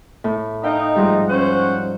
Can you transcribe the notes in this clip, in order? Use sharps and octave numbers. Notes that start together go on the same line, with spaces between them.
A2
D#4 E5 F5 G5
G#2 F3 G3
C#4 C5 F#5